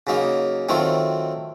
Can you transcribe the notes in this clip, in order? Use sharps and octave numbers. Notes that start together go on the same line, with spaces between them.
C#3 F#3 A#3 D#4
D#3 F#3 A3 C4 F4